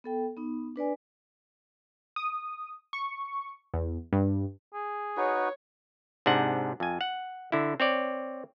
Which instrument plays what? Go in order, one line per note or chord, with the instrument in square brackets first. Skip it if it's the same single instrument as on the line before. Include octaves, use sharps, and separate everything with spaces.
[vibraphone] B3 A4 G5
B3 D#4
D4 B4 D5 G#5
[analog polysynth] D#6
C#6
E2
G2
[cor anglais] G#4
[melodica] D#4 F#4 B4 [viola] C#5
[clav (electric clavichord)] G#2 C3 D4 F#5
F2 G#5
F#5
D3 E4
C4 C#5 D5